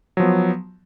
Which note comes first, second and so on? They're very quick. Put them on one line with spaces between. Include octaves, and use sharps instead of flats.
F#3 F3 B3